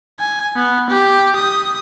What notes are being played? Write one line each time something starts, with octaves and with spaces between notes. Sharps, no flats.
G#5
B3
G4
D#6